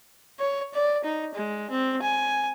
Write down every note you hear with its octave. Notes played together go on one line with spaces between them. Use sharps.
C#5
D5
D#4
G#3
C4
G#5